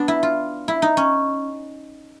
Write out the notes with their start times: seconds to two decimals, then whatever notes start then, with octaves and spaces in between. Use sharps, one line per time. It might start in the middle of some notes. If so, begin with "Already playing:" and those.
Already playing: B3 D4
0.08 E4
0.23 F4
0.68 E4
0.82 D#4
0.97 C#4